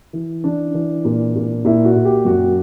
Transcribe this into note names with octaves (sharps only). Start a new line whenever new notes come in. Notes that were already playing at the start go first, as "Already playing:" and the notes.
E3
E3 D4
E3
A#2
A#2
A#2 E4
F#4
A#2
G4
F#2 F#4